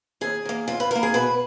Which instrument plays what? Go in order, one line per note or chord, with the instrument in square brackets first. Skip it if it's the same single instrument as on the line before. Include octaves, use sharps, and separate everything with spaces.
[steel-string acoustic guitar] D#2 G#4
D#3 A#3
D#2 F4
B4
D#3 A#3 A#4
G#4
B2 B4